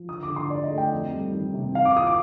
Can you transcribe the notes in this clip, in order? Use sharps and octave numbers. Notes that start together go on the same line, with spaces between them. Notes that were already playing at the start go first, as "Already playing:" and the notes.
Already playing: F3
D3 D#6
D6
D3
C6
D#4 D5
D#5
A3
G5
F2
G3
D#3
C3
D#3 F5
D6
F4 D#6
D6